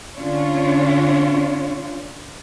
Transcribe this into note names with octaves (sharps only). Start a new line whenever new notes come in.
D3 C#4 D4 F4 C#5